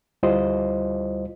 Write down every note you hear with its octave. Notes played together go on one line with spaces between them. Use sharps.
D2 G3 E4 F4 C5 D#5